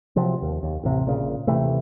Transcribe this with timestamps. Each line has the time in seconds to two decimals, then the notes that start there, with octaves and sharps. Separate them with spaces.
0.16 C3 F3 F#3
0.42 D#2
0.63 D#2
0.84 A1 C3
1.05 A#1 A#2 C#3
1.47 D#1 C3 E3 A3